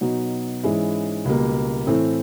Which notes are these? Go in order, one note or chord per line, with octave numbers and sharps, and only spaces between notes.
B2 F#3 B3 D#4 F#4
G#2 E3 G#3 C#4 E4
C#2 B2 G3 A#3
A2 E3 A3 C4